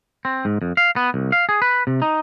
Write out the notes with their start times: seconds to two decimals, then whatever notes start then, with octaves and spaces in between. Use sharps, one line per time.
0.25 C4
0.45 G#2
0.62 F2
0.77 F5
0.96 B3
1.14 C2
1.32 F5
1.49 G#4
1.62 B4
1.87 C3
2.02 D#4